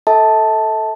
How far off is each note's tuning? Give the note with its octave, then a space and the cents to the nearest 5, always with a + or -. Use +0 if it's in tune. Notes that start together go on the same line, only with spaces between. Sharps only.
A4 +0 E5 -40 A5 +0